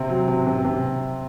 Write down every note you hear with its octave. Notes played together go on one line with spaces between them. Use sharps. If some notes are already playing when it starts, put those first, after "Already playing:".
Already playing: C3 C4
F#3
C3
C3
C3